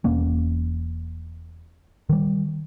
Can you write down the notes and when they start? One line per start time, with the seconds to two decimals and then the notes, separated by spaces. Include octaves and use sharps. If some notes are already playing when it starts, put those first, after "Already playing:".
0.04 E1 B2 A#3 C#4
2.09 D#3 G3